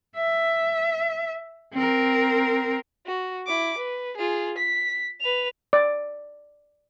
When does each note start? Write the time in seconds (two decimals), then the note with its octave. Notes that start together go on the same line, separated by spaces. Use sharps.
0.17 E5
1.73 C4 A#4
3.06 F#4
3.47 E4 D6
3.78 B4
4.17 F4 G#4
4.58 B6
5.21 B4 F7
5.73 D5